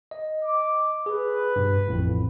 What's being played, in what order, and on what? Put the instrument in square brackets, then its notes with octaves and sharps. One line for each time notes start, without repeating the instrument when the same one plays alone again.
[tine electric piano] D#5
[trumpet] D6
[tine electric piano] G#4 [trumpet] B4
[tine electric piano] G2 B2
A1 F2 A2